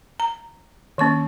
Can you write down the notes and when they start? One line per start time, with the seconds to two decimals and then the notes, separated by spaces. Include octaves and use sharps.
0.20 A#5
0.98 D#3 A#3 C#4 C#6